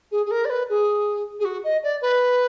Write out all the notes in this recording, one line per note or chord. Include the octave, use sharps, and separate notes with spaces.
G#4
G#4
A#4
D5
B4
G#4
G#4
F#4
D#5
D5
B4